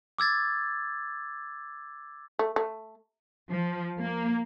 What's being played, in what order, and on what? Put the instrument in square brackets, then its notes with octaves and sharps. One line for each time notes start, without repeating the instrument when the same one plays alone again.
[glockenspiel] D6 E6 G#6 A6
[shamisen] A3
A3
[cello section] F3
A#3